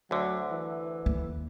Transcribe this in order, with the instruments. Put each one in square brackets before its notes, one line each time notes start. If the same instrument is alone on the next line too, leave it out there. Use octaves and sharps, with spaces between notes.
[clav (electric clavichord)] D2 D3 [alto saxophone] F#3
[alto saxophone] E3
[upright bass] D#2